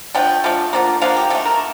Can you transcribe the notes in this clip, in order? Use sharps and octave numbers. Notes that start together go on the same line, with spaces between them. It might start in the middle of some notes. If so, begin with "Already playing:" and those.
D3 F3 A3 G5
D3 F3 A3
D3 F3 A#3
D3 F3 A#3 F5
G4
D3 A3 A4
A#4